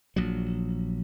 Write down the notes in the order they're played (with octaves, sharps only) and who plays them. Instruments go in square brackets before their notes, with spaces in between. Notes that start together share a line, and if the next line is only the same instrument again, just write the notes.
[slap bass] A#1 F#3